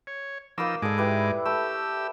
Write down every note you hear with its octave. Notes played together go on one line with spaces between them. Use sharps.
C#5
F3 A#3 D#4 B5 D6 E6
G#2 G#3 G#4 A4 D5 D6
E4 G4 B4
A3 G4 E6